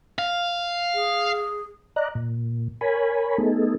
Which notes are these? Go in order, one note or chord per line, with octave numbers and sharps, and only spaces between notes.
F5
G#4
D5 D#5 A#5 F#6
A#2
A#4 C#5 G#5 B5
A3 B3 D#4 G#4 A4